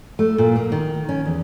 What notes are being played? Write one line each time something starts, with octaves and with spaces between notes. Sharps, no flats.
A3
A#2
A#3
D#3
C#4
E2